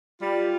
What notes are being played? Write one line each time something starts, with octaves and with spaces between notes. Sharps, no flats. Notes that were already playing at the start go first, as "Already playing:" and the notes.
G3 F4